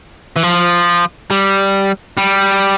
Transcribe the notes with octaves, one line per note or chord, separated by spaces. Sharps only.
E3
F3
G3
G3